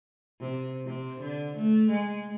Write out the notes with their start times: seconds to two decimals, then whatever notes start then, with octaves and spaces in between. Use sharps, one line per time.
0.40 C3
0.85 C3
1.20 D3
1.56 A3
1.90 G#3